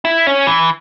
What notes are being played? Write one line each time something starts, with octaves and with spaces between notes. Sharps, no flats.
E4
C#4
E3